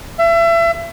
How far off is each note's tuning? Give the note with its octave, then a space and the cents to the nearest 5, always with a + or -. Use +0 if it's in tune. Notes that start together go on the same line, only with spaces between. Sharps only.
E5 +30